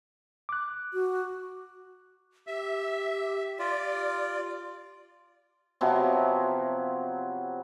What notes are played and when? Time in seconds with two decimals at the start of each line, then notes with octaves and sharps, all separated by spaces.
0.49 D6 F#6
0.93 F#4
2.47 G4 E5
3.59 F4 D5
5.81 C3 F3 F#3 B3